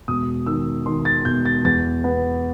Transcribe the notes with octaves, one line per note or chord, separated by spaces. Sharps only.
E1 D#6
D#3 E6
D#3 C6
A6
E1 G6
A6
E2 A6
B3